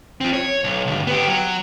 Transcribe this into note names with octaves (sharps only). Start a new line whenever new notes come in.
C4 F4
C#5
B1
D2 G2
B3 G4
F#3